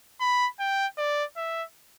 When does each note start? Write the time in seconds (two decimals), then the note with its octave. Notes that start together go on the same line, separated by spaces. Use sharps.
0.20 B5
0.60 G5
0.97 D5
1.36 E5